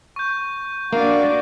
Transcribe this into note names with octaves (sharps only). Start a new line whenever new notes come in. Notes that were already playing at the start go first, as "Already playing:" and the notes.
C#6 G6
A#3 D4 F#4 F5